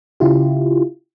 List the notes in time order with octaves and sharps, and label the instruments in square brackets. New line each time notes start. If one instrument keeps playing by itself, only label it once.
[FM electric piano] C#3 E4 F4 G4